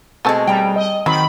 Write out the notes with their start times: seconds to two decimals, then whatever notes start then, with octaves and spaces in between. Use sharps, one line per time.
0.25 B2 G#3 A3 C4 A4
0.47 G3 G5 A#5
0.76 D#5
1.06 D#3 F#3 C4 B5